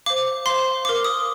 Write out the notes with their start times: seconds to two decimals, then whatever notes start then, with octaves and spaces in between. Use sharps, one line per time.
0.06 C5 F5 D6
0.46 C5 F5 C6
0.85 A#4 F5 D6
1.04 D#6